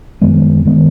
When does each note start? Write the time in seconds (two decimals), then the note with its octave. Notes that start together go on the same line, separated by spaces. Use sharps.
0.22 F#2 D#3 G#3 B3
0.66 D#3 G#3 B3